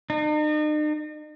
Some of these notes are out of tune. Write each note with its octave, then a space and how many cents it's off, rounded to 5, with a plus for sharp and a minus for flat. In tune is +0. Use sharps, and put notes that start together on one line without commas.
D#4 -45